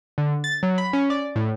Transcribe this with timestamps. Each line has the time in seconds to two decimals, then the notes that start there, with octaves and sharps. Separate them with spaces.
0.18 D3
0.44 A6
0.63 F#3
0.78 B5
0.93 C#4
1.10 D5
1.36 A2